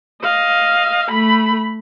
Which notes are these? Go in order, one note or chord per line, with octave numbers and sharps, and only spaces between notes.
D#5 F5
A3 B5